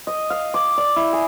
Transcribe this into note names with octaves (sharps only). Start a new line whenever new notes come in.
D#5
F5
D6
D5
E4
G#4